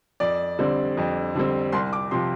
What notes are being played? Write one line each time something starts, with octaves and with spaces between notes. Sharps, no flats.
F2 D5
D3 G3 C4
F2
D3 G3 C4
C2 C6
D6
C3 F3 C6